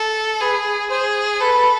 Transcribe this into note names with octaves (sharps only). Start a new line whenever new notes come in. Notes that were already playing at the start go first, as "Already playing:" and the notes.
Already playing: A4
G#4 B4
G#4 C5
A4 B4